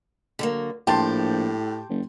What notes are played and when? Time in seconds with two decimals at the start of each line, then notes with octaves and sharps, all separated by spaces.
0.39 D3 F#3 A#3
0.87 A#1 A2 G4 G5 A5 C6
1.89 F#1